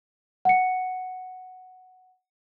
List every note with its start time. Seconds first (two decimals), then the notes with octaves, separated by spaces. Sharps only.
0.45 F#5 C#7